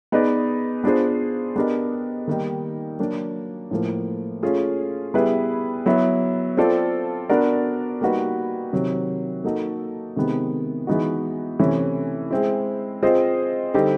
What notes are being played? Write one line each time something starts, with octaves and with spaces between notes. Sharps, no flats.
B3 D#4 G#4 B4 D5
B3 D4 F4 G#4 C5
B3 D4 G4 A#4 D#5
D#3 G3 A#3 D#4
F#3 A#3 D4
A2 F3 A#3
A3 C#4 F4 G#4
G3 B3 E4 G#4 B4
F#3 B3 E4
C4 F4 A4 D5
B3 D4 F#4 A#4 D5
G3 A#3 D#4 F#4 B4
C3 D#3 F#3
A#3 D#4 F#4 A4
C3 D#3 G#3 B3
E3 G#3 B3 D#4 F#4
C3 E3 A3 C#4
G#3 C4 E4
C4 F4 G#4 C5 D#5
D3 G3 C4 D#4 G4